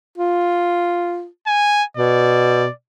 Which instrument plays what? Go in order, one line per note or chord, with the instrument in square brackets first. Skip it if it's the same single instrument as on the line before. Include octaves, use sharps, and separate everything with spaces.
[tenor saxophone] F4
[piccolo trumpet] G#5
[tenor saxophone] B2 [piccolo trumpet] D5